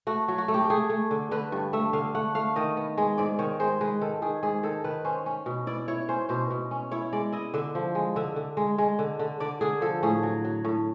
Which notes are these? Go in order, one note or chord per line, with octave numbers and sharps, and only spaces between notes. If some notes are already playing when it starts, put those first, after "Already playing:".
A3 F#4
F#3
F#4
A3
G4
G4
A3 G#4
A3
D3
D3 B4
G2
A3 E5
D3 F5
A3 F#5
A3 F5
D#3 D#5
B3
G#3
G#2 D5
D#3 C#5
G#3 C5
G#3 B4
D#3 A4
D#3 G#4
G#2 G#4
D#3 A4
D#3 B4
C#4 C5
C#4
B2
E4 D5
E4 C#5
C#4 C5
B2 C5
B2
C#4
E4 C#5
G#3 D5
E4 D#5
D3 E5
F3
G#3
D3 E5
D3
G#3
G#3
D3
D3
D3 D5
D3 G#4
F3 A4
A2 G#4
F#3
F#3
A2